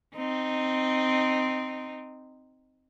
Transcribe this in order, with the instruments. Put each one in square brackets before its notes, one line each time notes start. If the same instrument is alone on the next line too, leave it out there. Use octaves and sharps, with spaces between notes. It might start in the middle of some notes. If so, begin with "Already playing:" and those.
[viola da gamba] C4 D#4